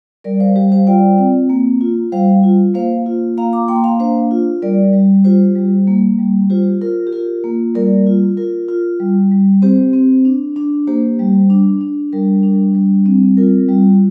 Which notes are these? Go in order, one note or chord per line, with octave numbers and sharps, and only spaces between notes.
G3 A#4 D5
C5 F5
G3 G4 C5
C5 F5
F4 D5 G5
C4
A#3
F4
G3 C5 F5
F4
A#3 C5 F5
F4
A#3 F5 A#5
A#5 D6
A#3 G5 C6
F5 A#5
D4 C5 F5
F4
G3 A#4 D5
G3
F4 G4 C5
G3
A#3
G3
F4 G4 C5
F4 A#4
G4
F4 A#4
A#3
G3 A#4 D5
F4
F4 A#4
F4
G3
G3
C4 G4 C5
C4
D4
D4
A#3 G4 C5
G3
D4
D4
G3 A#4
D4
G3
C4
F4 A#4
G3